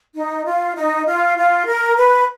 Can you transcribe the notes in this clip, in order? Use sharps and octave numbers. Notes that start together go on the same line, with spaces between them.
D#4
F4
D#4
F4
F4
A#4
B4